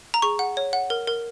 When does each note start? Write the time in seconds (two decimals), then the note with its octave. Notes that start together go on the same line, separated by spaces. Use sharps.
0.14 A#5
0.22 G#4 C#6
0.39 F#5
0.57 C#5
0.73 F#5
0.90 A#4
1.07 A#4